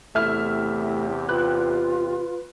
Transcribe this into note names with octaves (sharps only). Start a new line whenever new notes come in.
E2 C3 A3 E4 G4 E5 F6
F4 B4 F#6